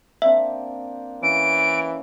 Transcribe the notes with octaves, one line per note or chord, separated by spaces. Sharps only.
A#3 C4 D4 E5
E3 C#4 F5 D7